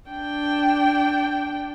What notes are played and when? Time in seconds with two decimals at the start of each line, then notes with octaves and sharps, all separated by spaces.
0.10 D4 G5